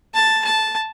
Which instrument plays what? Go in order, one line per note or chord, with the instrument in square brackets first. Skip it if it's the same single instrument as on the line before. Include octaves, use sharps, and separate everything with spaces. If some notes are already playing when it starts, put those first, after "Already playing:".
[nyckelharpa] A5
A5